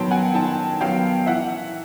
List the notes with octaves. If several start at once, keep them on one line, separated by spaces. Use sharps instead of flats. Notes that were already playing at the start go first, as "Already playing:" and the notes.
Already playing: D#3 F#3 B3 G5 A5 B5 C6
F#5 G#5
D#3 G5 A5
F#3 B3 F5 G5
E3 E5 F#5